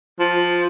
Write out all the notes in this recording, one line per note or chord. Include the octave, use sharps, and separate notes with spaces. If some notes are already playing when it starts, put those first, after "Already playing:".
F3